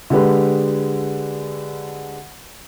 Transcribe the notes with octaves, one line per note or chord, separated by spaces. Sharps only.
D3 G#3 G4 B4